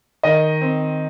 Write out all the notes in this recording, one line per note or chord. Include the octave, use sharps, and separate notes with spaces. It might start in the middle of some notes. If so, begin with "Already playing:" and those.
D#3 D#5
C4